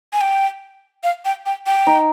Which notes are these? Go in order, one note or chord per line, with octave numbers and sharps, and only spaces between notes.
G#5
G5
F5
G5
G5
G5
D#4